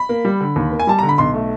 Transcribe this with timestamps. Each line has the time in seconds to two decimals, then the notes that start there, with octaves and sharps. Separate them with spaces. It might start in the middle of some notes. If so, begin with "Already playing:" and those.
Already playing: B5
0.09 A#3
0.25 G3
0.41 D3
0.56 D#2
0.72 A#3
0.79 G#5
0.87 G3 A5
0.99 D3 A#5
1.09 B5
1.18 B1 C6
1.34 A3